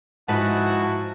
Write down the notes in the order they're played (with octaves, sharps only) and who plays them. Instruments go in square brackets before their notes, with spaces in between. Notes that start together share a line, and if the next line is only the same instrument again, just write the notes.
[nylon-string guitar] G#2 B4 [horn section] F3 E4 F#4 [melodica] D#4 F#5 A5